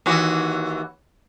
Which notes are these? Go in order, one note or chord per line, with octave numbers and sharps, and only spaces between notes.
D#2 E3 F#4